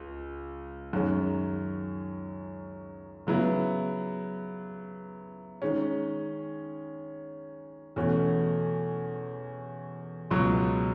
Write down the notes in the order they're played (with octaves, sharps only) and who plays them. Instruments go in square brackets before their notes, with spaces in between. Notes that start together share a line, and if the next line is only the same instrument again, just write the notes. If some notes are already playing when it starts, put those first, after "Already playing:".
Already playing: [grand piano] C#2
F#2 D#3 G#3 C#4
C#3 F#3 B3 E4
D#3 G#3 C#4
E2 B2 A3 C#4
C#2 B2 F#3